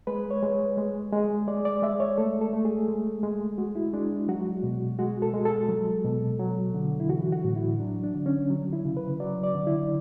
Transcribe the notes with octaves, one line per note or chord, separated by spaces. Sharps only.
G#3 B4
C#5
G#3
G#3
G#3
G#3 D5
D5
G#3 E5
C#5
A3 A4
A4
A3
G#4
G#3
G#3
G#3 F#4
E4
G#3 D4
F#3 F#4
B2
G#3 F#4
A4
G#3
A4
F#3
B2
F#3
D3
E4
E3 F#4
F#4
A2
E4
F#3 D4
D4
D3
C#4
F#3
E4
C#3
B4
F#3 D5
D5
D3
E4